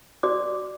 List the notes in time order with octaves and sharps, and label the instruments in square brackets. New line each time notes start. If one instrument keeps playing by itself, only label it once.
[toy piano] F#4 D5 D6